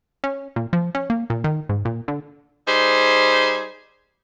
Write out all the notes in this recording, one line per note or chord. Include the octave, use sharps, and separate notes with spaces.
C#4
A#2
F3
C#4
A#3
A#2
D#3
G#2
A#2
D3
G3 D#4 G#4 C5